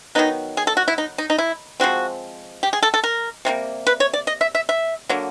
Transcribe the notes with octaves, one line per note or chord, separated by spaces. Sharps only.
D#3 F#3 B3 D#4
G#4
A4
F#4
E4
D#4
D#4
D#4
E4
F3 G#3 C4 F#4
G4
G#4
A4
A4
A#4
C3 E3 G3 A#3
B4
C#5
D5
D#5
E5
E5
E5
D3 F#3 A#3